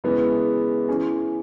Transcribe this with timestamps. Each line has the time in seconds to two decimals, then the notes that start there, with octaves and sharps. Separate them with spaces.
0.04 C#3 E3 G#3 B3
0.89 E3 C#4 G#4